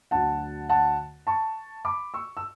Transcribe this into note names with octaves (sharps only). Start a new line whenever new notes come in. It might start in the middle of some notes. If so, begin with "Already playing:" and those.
D2 D3 F#3 F#5 A5
F#5 A5
A5 C#6
B5 D6
C#6 E6
E6